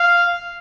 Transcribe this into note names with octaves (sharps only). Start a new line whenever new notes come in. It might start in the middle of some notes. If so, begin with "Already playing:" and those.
Already playing: F5